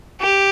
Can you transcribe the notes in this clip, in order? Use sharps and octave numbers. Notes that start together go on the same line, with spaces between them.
G4